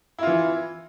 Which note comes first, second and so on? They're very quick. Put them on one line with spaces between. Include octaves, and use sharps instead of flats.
E4 F4 E3